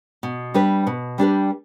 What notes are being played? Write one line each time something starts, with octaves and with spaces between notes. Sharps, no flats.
B2
G3 D4 G4 B4
B2
G3 D4 G4 B4